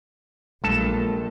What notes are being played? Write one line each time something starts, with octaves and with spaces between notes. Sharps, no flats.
A#1 G2 F#3 G#3 A3 A4 A5